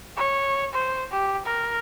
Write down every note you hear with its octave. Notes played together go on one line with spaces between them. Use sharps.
C#5
C5
G4
A#4